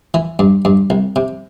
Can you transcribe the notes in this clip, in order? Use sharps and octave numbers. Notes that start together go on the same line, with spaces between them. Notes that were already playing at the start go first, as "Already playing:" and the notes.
E3
G2
G2
C2
C3